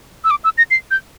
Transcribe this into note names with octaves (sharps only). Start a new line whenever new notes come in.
E6
D6
E6
A#6
C7
G6